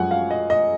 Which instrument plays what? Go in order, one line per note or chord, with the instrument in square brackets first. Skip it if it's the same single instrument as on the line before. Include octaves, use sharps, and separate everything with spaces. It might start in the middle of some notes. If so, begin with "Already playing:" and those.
Already playing: [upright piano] F#2 F3 G#3 F#5 G#5
F5
D#5
D#5